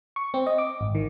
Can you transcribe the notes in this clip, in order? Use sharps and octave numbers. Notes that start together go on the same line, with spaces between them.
C#6
C4
D#5
D6
G#1
D#3